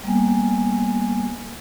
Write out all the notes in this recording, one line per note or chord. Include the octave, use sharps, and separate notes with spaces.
G3 A#3 B3 G#5